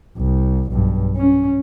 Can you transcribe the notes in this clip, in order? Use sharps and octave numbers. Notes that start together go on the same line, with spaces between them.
C2
B1 G2
C#4